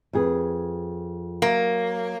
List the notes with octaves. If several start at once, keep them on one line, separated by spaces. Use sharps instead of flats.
F2 G#4 B4
F#3 A#3